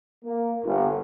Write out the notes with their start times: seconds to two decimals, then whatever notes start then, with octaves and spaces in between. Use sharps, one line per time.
0.25 A#3
0.65 G1